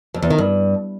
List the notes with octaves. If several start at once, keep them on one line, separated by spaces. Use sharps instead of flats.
F2
E2
D#3
G2